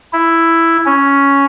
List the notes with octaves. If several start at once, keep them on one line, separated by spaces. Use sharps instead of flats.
E4
C#4